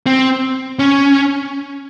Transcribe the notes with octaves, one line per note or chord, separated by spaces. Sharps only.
C4
C#4